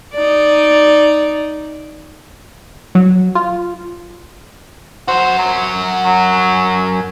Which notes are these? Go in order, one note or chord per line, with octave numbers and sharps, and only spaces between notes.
D#4 D5
F#3
F4
F#2 F#4 C5
F#3
F#3